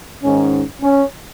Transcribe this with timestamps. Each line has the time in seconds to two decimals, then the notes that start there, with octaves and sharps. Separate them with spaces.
0.22 G#2 D#3 C#4
0.82 C#4